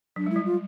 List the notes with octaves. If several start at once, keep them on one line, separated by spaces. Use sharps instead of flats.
F#3 D4
G#3
E4
G3
F4